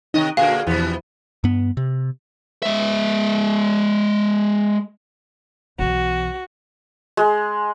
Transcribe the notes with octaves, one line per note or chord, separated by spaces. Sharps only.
C3 D#3 D#4 D#5
A#2 D3 A#3 F#4 G#4 F5
E2 B2 E3 F3 B3
G2 B3
C3
G#3 E5
B1 E3 F#4
G#3